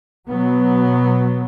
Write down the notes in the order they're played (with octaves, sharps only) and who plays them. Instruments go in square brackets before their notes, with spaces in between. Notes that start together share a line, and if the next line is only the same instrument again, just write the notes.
[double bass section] B2 F#3 B3